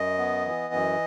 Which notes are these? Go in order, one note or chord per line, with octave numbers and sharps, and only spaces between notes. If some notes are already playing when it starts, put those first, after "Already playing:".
Already playing: F#2 D#5
B3
E3
F#2